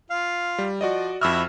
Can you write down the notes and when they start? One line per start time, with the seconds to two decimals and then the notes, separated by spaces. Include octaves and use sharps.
0.10 F4 F5
0.58 G3
0.81 F3 F#4 D5 D#5
1.21 F2 E4 F#4 E5 E6 F6